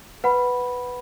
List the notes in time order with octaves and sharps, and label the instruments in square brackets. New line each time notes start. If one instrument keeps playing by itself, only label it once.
[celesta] B4 F#5 B5